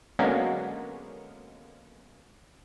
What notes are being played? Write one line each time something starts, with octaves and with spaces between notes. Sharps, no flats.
D3 F#3 G#3 A#3 B3 C#4